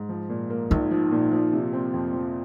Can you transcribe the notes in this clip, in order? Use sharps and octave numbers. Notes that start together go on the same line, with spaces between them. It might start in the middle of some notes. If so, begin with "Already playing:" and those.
Already playing: G#2
F3
A#2
A#3
A#1 D#4
F3
A#2
F3
C3
C4
F2
F3